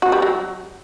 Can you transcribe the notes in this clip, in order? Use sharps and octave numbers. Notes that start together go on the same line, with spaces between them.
F#4
G3
F#3